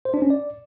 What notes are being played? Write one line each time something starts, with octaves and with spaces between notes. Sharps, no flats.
C5
D4
C#4
D5